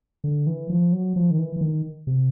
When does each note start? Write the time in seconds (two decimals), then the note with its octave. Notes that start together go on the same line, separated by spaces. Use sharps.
0.24 D3
0.47 E3
0.70 F3
0.92 F#3
1.16 F3
1.31 D#3
1.39 E3
1.56 E3
1.61 D#3
2.07 C3